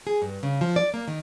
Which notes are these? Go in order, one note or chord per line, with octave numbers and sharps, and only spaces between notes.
G#4
G2
C#3
F3
D5
A#3
D#3